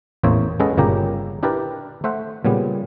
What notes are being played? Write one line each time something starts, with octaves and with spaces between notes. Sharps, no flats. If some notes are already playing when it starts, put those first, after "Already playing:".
A1 E2 A#3 C5 C#5 E5
G#3 C#4 A4 B4 D#5 F#5
G1 A#2 C#3 A#3 G4 A#5
D4 E4 G4 A#4 B4 D5
A3 C5 E5 F#5
A#2 C#3 G3 B3